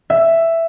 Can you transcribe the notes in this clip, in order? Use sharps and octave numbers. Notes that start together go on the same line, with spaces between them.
E5